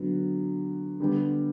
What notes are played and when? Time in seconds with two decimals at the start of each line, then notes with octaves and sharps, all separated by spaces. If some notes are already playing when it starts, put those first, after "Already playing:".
Already playing: D3 F#3 B3
1.00 D3 G3 B3